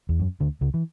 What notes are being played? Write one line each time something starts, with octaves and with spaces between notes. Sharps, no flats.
E2
F#2
D2 D3
C#2 C#3
E3